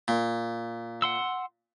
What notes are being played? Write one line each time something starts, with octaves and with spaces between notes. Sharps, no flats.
A#2
F#5 C6 E6